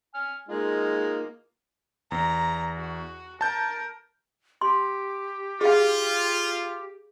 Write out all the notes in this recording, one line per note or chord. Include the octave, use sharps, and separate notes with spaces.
G#5 F6
G#3 A#3 D#4 F4
E2 A#5
F#4
A#4 A5 G6
G4 C6
F4 G#4 F5